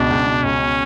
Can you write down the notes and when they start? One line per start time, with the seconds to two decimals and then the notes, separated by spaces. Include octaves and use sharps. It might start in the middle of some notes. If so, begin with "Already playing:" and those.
Already playing: C#2 B2 D4
0.10 C#2
0.27 B2
0.44 C#2 C#4
0.61 B2